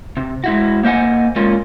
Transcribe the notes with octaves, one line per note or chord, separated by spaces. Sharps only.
C3
G#3 E4 F#4
A#3 C5 D#5 F#5 G#5
G#3 A#3 C#4 F4